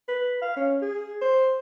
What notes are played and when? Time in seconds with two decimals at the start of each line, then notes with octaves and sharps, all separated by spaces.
0.08 B4
0.42 F5
0.56 C#4
0.82 G#4
1.21 C5